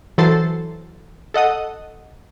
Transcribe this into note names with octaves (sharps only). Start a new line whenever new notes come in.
E3 F#3 A4 C5 A6 C7
A4 D#5 F#5 D#6